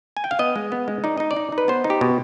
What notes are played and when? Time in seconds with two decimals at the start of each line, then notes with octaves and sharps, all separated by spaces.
0.17 G#5
0.24 G5
0.31 F5
0.39 B3 D#5
0.56 G#3
0.72 B3
0.88 G#3
1.04 D#4 D5
1.18 D#4 D#5
1.31 D5
1.36 D#4
1.52 D#4
1.58 B4
1.68 B3 C5
1.84 D#4
1.90 G4
2.01 B2